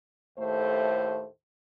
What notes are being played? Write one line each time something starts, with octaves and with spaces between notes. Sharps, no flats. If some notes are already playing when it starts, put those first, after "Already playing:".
D#2 A2 A3 C5